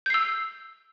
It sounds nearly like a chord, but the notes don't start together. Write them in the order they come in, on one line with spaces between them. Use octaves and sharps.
G6 C7 E6